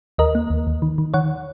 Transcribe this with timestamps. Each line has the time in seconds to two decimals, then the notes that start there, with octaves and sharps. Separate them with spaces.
0.18 D#2 A#4 D#5
0.35 A#3
0.50 D#2
0.67 D#2
0.82 D#3
0.98 D#3
1.14 D#3 C#5 F#5